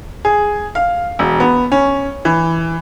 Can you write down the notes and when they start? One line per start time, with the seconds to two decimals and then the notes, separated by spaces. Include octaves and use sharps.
0.25 G#4
0.75 F5
1.19 E1
1.40 B3
1.72 C#4
2.25 E3